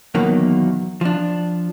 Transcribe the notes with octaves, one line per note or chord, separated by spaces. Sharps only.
E2 B2 D#3 F#3 A#3
F3 D4